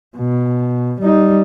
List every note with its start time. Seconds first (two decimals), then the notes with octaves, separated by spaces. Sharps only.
0.17 B2
1.01 G3 D#4